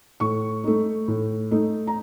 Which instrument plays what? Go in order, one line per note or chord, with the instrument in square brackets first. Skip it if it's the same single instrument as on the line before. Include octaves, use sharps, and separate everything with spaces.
[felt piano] A2 C#6
A3 D#4
A2
A3 D#4
A#5